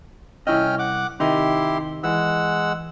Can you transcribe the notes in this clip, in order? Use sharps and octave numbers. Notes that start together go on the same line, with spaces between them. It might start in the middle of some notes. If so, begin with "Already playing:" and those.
C2 C#4 E4 D#5 G5 F6
F#5 D6
C3 D#3 D#4 E4 G4 C6
E3 G#3 F#5 E6